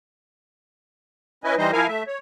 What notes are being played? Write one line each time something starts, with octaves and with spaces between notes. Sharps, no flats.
C#4 E4 B4 D#5 G#5
E3 G3 D#4 C5 D#5
F3 E4 A#4 F5 G#5
A3 E5
C#5